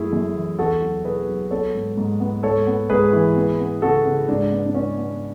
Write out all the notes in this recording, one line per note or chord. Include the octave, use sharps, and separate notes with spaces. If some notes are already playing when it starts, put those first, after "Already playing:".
Already playing: F#2 A3 E4 G#4
F#2
E3
E2 F#4 A4
F#3
B2 G#4 B4
F#3
B3 A4 C#5
G#2
G#2
B3
G#2 A4 C#5
B3
G#2 G#4 B4
E3
B3
B3
C#3 F#4 A4
C#3
G#2 D4
B3
D4
B3 C#4
B3